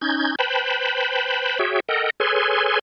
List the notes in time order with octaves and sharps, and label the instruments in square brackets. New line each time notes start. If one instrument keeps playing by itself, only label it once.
[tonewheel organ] C#4 D#4 G6 G#6
B4 C5 G5 A5 B5
F#4 G#4 C#5 E5 G5
A4 A#4 D#5 F#5 G5
G#4 A4 B4 C#5 G#5 C6